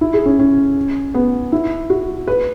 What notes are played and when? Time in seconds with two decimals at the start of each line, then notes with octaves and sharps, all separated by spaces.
0.01 E4
0.14 G#4
0.26 C#4
0.39 C#4
1.14 B3
1.52 E4
1.90 F#4
2.28 B4